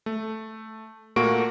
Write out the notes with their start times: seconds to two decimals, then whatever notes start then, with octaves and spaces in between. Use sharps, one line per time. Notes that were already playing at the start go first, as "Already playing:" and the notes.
0.06 A3
1.16 A#2 A3 A#3 F#4 C#6 D7